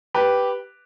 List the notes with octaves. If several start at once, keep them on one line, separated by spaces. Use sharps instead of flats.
G4 B4